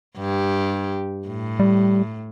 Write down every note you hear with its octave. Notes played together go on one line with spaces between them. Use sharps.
G2 G4
A2
G3